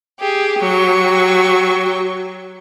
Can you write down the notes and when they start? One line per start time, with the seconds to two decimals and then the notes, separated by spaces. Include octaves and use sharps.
0.19 G4 G#4
0.59 F#3 G4 C#6